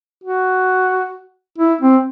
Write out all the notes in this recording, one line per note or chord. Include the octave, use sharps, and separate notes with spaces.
F#4
E4
C4